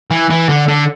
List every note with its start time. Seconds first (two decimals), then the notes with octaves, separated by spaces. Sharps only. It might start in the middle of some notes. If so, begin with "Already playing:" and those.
0.11 E3
0.30 E3
0.49 D3
0.68 D3